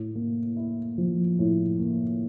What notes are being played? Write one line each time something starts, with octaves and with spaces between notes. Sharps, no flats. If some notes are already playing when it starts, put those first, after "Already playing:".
Already playing: A2
A#3
E4
F3
A2
A#3